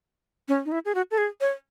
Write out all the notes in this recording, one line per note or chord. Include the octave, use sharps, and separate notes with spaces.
C#4
D#4
E4
G#4
F#4
A4
G#4
C#5